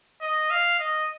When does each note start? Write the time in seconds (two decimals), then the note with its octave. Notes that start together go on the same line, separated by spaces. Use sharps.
0.21 D#5
0.50 F5
0.80 D#5